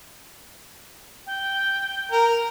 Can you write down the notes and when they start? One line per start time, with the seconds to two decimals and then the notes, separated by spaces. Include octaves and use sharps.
1.26 G5
2.12 A#4